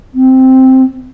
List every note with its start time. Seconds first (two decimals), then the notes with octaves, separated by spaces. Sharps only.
0.14 C4